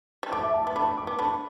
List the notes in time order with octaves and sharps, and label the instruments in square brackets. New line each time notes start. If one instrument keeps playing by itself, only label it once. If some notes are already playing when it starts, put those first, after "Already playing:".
[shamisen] G3
[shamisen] A3 [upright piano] D6
[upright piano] E5
A5
[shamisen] B3 [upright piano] D6
[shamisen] A3 D4 [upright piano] B5
[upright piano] D6
[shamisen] B3
[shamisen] A3 D4 [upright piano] B5